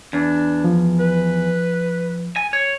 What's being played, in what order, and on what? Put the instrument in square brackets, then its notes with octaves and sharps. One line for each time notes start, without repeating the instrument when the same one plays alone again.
[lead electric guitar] E2 [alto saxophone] D4
[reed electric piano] F3
[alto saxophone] B4
[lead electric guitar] G#5
C#5